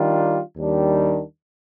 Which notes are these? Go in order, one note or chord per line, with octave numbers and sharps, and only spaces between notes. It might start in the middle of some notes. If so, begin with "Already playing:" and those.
Already playing: D#3 G3 D4 F4
D#2 D#3 G3 D4